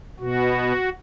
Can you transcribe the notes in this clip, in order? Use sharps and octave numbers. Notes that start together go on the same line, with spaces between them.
B2 B3 F#4